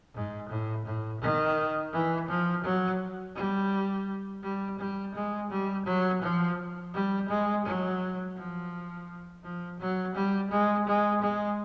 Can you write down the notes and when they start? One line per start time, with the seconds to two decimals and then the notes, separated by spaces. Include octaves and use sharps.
0.14 G#2
0.49 A2
0.85 A2
1.21 D#3
1.93 E3
2.29 F3
2.64 F#3
3.35 G3
4.43 G3
4.79 G3
5.15 G#3
5.50 G3
5.86 F#3
6.22 F3
6.94 G3
7.29 G#3
7.65 F#3
8.36 F3
9.43 F3
9.79 F#3
10.15 G3
10.51 G#3
10.87 G#3
11.22 G#3